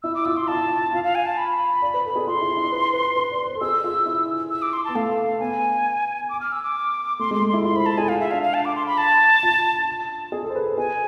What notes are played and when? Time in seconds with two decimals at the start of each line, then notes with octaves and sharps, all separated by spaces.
0.03 E4 E6
0.15 D6
0.25 F4 E6
0.37 C6
0.48 F4 A5
0.93 F4 F5
1.04 F5
1.15 G#5
1.26 A5
1.38 B5
1.82 D5
1.94 B4
2.05 A4
2.16 G#4
2.27 F4 C6
2.41 E4
2.57 E4
2.72 B4
2.93 B4
3.16 B4
3.31 D5
3.47 C5
3.55 A4
3.61 G#4 E6
3.84 F4
4.06 E4
4.51 E6
4.62 D6
4.73 C6
4.85 B3 A5
4.95 A3 F5
5.40 B3 G#5
6.29 D6
6.41 F6
6.52 E6
6.63 D6
7.19 A3 C6
7.31 G#3 C6
7.41 A3
7.49 E4 C6
7.64 F4 C6
7.75 C5 B5
7.86 A4 A5
7.98 G#4 G#5
8.09 F4 F5
8.20 E5
8.31 D4 F5
8.43 F5
8.54 A5
8.65 D6
8.76 C6
8.87 B5
8.98 A5
9.43 F4
10.32 G#4
10.44 A4
10.50 C5
10.55 B4
10.66 A4
10.78 G#4 G#5